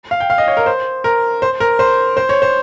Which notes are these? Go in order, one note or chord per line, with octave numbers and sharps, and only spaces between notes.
F5
G5
F5
D#5
C#5
A#4
C5
A#4
C5
A#4
C5
C5
C#5
C5